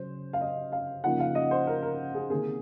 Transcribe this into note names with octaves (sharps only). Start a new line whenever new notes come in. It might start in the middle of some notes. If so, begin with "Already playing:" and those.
Already playing: C#3 F#3 C#4 C5
F5
D#5
F5
C#3 F3 A#3 D#4 F#5
F5
D#5
C5
A#4
A#4
G#4
C3 D#3 A#3 G#4